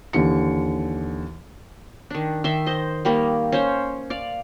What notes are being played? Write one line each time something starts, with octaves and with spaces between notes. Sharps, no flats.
D#2 D3 E3 C#7
D#3 D4
D#3 E5 C6
C5 D#5
D#3 G3 A#3
C#4 C5 C#5
D5 F5